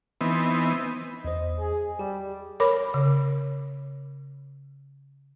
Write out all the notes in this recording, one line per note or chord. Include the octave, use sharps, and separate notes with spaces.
E3 B3 C4 D#4
E2 C5 D#5
G#4
G3 G4
A#4 C#5 B5 D6
C#3